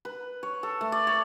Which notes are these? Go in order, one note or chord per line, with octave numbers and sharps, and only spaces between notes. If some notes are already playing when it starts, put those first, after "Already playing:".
B4
C#5
A4
A3
D5
C#5